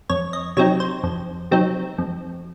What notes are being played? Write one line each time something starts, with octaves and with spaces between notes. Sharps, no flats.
F2 C#5
D#5
C3 F#3 C4 D#4 C#5
C5
F2
C3 F#3 C4 D#4
F2